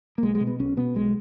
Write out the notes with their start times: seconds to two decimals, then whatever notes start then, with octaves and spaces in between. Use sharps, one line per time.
0.18 A#3
0.23 B1 G#3
0.35 G#3
0.40 B2
0.47 B3
0.60 B1 C#4
0.77 B2 B3
0.95 B1 G#3